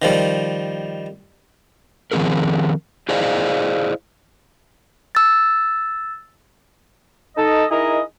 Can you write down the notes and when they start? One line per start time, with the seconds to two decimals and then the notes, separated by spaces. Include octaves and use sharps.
0.02 D#3 F3 G3
2.12 D#3 F3 F#3 C4 G#4 A#4
3.09 E4 G#4 C5 D5 D#5 F5
5.15 E6 A6
7.37 D#4 A4 D#5
7.70 D#4 E4 G#4 A#4 D#5